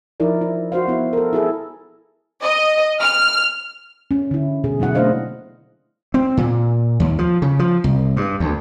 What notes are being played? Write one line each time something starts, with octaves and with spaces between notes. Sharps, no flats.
F3 D#4 E4 A#4 D5
E4
F#4 C5 F5
B3 E4
A4 A#4
E4 G#4 A4
D#5
F6
C#4
D3 E4
B2 G#4
F#3 A#3 E4 F#5
A3 D4 C5 D#5 F5
C4
A#2
D#2
F3
C#3
F3
C2
G2
D2